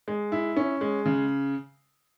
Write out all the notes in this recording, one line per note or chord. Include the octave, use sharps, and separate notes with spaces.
G#3
E4
C#4
G#3
C#3